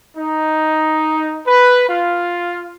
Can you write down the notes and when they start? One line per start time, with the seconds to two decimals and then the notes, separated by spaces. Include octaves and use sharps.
0.17 D#4
1.47 B4
1.88 F4